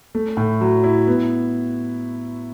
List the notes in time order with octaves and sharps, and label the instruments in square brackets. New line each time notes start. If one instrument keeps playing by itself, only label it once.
[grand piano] A3
A2
F#3
E4
B3